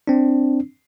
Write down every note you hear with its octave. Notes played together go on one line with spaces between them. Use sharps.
C4 D4